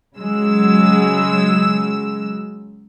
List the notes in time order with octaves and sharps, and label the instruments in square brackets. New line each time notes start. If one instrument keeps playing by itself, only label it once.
[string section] C#3 F#3 G#3 E6